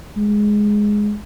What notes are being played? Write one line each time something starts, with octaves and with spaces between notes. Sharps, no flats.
G#3